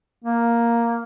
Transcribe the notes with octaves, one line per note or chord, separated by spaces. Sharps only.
A#3